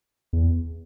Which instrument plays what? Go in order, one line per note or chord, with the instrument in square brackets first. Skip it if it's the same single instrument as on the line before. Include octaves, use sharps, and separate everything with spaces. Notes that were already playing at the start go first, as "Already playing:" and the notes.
[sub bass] E2